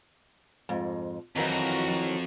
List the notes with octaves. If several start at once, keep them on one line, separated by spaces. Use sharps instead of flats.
F2 G#2
F2 D#3 E3 F#3 F#4 A#4